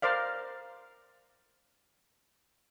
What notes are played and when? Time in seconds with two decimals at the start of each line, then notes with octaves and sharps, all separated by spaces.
0.02 A#4 C5 D5 F5